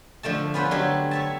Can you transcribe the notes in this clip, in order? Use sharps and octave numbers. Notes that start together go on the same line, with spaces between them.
D3 F3 A3 A5
B3 C#4 F4 B4 C5
D3 F#3 G4
C#5 E5 A5